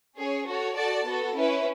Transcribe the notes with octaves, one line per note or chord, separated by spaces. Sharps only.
C#4 G#4 C#5
F#4 A4 C#5
F#4 A4 D5 A5
B3 F#4 A4
C#4 E4 B4